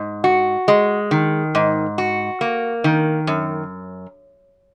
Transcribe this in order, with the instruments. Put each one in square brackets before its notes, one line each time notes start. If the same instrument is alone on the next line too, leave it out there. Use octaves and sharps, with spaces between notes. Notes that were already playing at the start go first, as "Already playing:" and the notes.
Already playing: [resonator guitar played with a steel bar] G#2
F#4
G#3
D#3
G#2
F#4
A#3
D#3
F#2